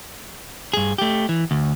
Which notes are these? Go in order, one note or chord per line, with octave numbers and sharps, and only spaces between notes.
G2 G#4
A3 G4
E3
D2